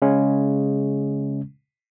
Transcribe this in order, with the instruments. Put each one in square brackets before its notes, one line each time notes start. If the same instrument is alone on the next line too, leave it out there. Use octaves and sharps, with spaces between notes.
[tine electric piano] C#3 G#3 C#4